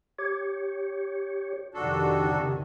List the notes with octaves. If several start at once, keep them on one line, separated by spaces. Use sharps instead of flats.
G4 C#5
F2 C3 D#3 D4 F#4 A4
C#3